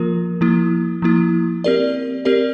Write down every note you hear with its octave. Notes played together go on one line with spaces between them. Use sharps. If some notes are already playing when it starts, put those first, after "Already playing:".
Already playing: F3 A#3 F4 A#4
F3 A#3 E4
F3 A#3 E4
C4 G4 A#4 D5
C4 G4 A#4 D5